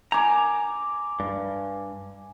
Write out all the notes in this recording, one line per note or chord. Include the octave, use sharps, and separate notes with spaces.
G#5 A#5 D6
G2